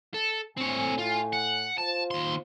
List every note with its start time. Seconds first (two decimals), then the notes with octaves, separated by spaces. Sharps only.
0.14 A4
0.58 A2 C4 C#5 G#5
0.99 F4
1.33 F#5
1.78 F4 C5 A5
2.11 D#2 C6